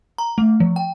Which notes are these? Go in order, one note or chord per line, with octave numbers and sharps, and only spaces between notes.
A#5
A3
F3
G5